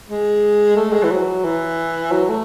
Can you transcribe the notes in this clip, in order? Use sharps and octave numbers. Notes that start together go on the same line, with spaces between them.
G#3
A3
G#3
E3
F#3
E3
F#3
A3